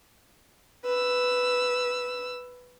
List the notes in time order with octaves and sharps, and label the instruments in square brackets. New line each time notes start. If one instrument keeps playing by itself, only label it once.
[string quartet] B4 E6